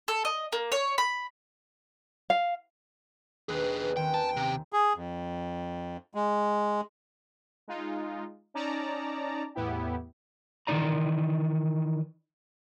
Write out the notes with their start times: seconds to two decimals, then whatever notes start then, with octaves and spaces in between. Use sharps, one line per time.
0.08 A4
0.25 D#5
0.52 A#3
0.72 C#5
0.98 B5
2.30 F5
3.49 D#2 D4 G#4 B4
3.97 D#3 C4 C#4 G5
4.14 A5
4.37 C3
4.73 G#4
4.96 F2
6.15 G#3
7.68 G#3 D#4 F4
8.54 C#4 D#4 D5 A5 A#5
9.55 E2 A2 B3 E4 G4
10.67 D#3 E3 A#3 D#4 D5 A#5